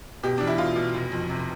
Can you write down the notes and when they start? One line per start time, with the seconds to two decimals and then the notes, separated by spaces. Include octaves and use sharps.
0.23 B2 G4
0.38 E2 D4
0.47 E4
0.58 B2 F4
0.76 B2
0.94 F1
1.12 F2
1.29 C3